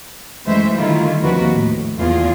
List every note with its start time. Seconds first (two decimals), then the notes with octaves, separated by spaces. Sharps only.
0.44 F#2 E3 G#3 A3 C5 E5
0.75 D3 D#3 G3 A3 E4 F4
1.21 D#2 C3 F3 D4 F#4 B4
1.52 A2
1.98 E2 F4 G#4